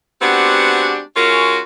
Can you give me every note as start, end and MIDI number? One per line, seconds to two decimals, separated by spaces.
0.22 1.00 56
0.22 1.00 59
0.22 1.00 60
0.22 1.00 62
0.22 1.00 66
0.22 1.00 67
1.16 1.59 56
1.16 1.59 61
1.16 1.59 65
1.16 1.59 66
1.16 1.59 70